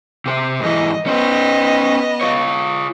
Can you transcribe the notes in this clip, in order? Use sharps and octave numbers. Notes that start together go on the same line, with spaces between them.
C3 C5
G#2 E3 D#5
B3 C#4 C5 D#5
F4 C#5